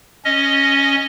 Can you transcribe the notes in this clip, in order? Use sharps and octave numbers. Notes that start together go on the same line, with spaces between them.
C#4 D#5